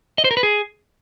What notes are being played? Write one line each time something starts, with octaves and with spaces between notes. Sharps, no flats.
D#5
C5
A#4
B4
G#4